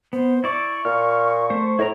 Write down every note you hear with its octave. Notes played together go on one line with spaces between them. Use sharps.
B3 C5
E4 D5 C#6
A#2 F6
A3 C5
A2 E4 A#4 A#5